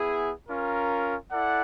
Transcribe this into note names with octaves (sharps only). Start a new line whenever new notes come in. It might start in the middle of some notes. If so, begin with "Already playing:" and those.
Already playing: B3 E4 G#4
C#4 F4 A#4
E4 A4 D5 F#5